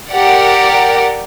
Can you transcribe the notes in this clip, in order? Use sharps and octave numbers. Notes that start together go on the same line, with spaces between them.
G4 A#4 D5 F#5